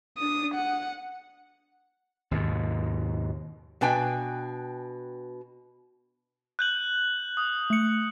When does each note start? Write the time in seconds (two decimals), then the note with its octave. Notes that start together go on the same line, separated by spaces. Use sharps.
0.18 D4 D#6
0.54 F#5
2.31 D#2 G#2 B2
3.81 B2 D4 B4 G5 G#5
6.59 F#6 G6 F#7
7.37 D#6
7.70 A3 C#7